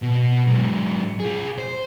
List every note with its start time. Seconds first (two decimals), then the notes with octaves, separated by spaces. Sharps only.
0.02 B2
0.47 G#2 F#3
1.20 F4 G#4
1.59 C5